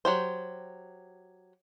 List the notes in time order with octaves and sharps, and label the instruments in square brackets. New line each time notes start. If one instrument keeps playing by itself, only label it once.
[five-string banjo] F#3 G4 C5